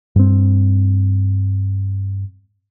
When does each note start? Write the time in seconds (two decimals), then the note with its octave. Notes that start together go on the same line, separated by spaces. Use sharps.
0.16 G2 C4